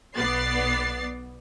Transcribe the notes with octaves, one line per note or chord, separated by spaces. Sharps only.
B1 B3 D5 A6 C7